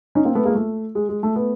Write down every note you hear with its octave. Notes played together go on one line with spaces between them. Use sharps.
C#4 D#4
A#3 C4
A3 B3
G#3 A#3
A3
G#3
G#3
A3
A3 B3